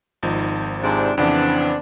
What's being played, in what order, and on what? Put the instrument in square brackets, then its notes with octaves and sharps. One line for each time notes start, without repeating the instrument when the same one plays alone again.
[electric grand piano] G#1 F3 D#4
[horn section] G#2 C3 D4
[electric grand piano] F2 C#3 E3 [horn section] B3 C4 D4